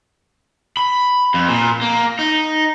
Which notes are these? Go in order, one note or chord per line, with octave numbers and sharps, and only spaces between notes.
B5
F2
A#2
A#3
D#4